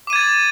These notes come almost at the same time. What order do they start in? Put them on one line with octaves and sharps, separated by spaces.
D6 D#7 G#6 A6